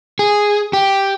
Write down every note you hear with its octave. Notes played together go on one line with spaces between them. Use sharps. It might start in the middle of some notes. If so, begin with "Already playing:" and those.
G#4
G4